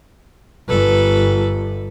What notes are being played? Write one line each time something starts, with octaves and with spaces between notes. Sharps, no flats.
G1 A4 B4